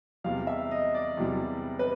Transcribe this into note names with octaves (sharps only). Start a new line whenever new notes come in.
E2 C3 E3 G3 F5
E5
D#5
D5
E2 C3 E3 G3
B4